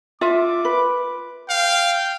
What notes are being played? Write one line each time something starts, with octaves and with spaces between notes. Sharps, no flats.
F4 E5 D6
B4
F5 G5